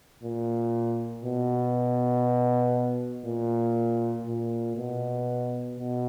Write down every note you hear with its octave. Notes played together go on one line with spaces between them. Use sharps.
A#2
B2
A#2
A#2
B2
B2